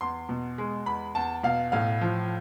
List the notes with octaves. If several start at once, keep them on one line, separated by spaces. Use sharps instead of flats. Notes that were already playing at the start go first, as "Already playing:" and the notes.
E2 C6
B2
G#3
E2 B5
E2 A5
B2 F5
A2 F5
F3